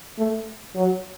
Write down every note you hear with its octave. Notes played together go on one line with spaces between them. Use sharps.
A3
F#3